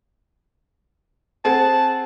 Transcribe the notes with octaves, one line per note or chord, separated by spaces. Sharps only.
C4 G#4 F#5 A5